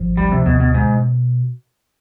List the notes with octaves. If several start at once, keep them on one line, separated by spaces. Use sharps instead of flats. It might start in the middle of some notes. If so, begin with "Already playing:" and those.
Already playing: G#1 F3
D2 G3
C3
D2 B2
B2
G#2 B2